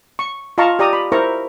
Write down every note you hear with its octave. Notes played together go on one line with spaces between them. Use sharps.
C#6
F4 D#5 F5 A5 A#5 C#6
G4 D5 A#5 D#6
B5
E4 A#4 C5 A#5 C#6